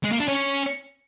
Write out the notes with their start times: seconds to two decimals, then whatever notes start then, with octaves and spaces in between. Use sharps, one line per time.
0.04 G#3
0.12 A#3
0.20 D4
0.28 C#4